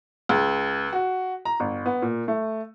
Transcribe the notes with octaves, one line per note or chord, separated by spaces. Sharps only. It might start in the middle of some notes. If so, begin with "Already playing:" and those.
C#2
F#4
A#5
G1
B3
A#2
A3